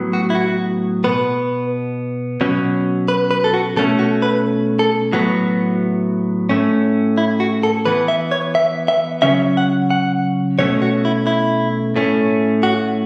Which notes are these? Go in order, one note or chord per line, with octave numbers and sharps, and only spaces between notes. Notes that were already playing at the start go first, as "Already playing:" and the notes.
Already playing: A2 F#3 B3
F#4
E4
F#4
B2 B3 B4
B2 F#3 C#4
B4
B4
A4
F#4
B2 A3 C#4 A4
F#4
B4
A4
A2 F#3 B3 F#4
A2 A3 C#4
E4
F#4
A4
E3 B3 B4
E5
C#5
E5
E5
C#3 F#3 C#4 E5
F#5
F#5
B2 A3 C#4 C#5
F#4
E4
E4
A2 A3 C#4
F#4